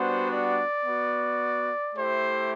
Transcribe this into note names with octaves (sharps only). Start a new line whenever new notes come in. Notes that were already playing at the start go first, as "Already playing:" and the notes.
Already playing: G3 B3 D4 F#4 C5
D5
B3 F#4
A3 E4 G4 C5